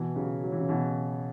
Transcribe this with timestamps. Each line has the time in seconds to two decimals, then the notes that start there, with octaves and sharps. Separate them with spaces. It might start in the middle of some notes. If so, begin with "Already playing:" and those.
Already playing: B2 E3
0.16 C#3 F#3
0.43 F#3
0.52 E3
0.60 C#3
0.69 B2 E3